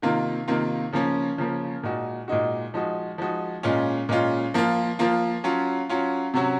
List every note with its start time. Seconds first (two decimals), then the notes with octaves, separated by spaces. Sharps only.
0.02 C3 D#3 A#3 F4
0.48 C3 D#3 A#3 F4
0.92 C#3 F3 A#3 C#4
1.38 C#3 F3 A#3 C#4
1.83 A#2 G#3 D#4 F#4
2.28 A#2 G#3 D#4 F#4
2.74 F3 G#3 D#4 F#4
3.18 F3 G#3 D#4 F#4
3.63 A#2 G#3 C#4 F4
4.09 A#2 G#3 C#4 F4
4.54 F3 A#3 F4
4.99 F3 A#3 F4
5.44 F#3 C#4 F4
5.89 F#3 C#4 F4
6.34 C3 F#3 C#4 F#4